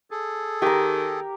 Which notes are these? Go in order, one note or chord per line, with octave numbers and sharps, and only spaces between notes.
G#4 A4
D#3 G4 A#4